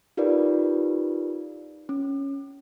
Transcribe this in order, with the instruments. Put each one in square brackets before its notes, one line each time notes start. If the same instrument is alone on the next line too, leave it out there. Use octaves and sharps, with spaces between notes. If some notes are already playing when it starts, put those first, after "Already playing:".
[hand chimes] D#4 F4 G4 A#4 B4 D5
C#4